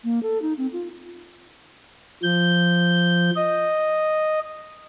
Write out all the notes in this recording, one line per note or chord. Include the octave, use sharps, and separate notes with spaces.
A#3
A4
D#4
C4
F4
F3 G6
D#5